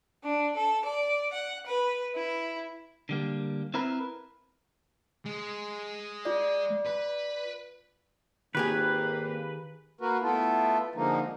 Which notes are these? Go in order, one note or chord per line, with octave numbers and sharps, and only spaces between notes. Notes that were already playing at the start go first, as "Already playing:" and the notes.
D4
A4
D5
F#5
B4
E4
D3 G3 A#3
C4 E4 A#4 B4
G#3
F4 D5
B4
G#1 D#3 A#3 G4 G#4 B4
A#3 F#4 A#4 B4
A3 B3 E4 F4 A4
D3 F3 G#3 A#3 D#4